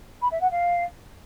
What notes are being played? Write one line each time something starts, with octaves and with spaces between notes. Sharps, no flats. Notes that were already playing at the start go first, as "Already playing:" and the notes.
B5
E5
F#5
F5